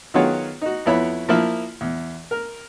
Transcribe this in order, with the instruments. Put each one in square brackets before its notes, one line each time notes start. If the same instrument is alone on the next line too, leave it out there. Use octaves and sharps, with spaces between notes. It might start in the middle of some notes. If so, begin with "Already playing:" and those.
[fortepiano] D#3 F#3 B3 F4 G#4 C#5
D#4 F#4
F2 B3 E4 C#5 B5
F3 A#3 E4
E2
A#4